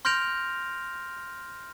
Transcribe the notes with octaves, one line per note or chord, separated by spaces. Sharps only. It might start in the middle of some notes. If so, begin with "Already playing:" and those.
C6 F6 G6 A#6 D7 F7